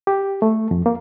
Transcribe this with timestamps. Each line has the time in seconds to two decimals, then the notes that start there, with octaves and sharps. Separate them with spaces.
0.07 G4
0.42 A3
0.71 F2
0.86 A#3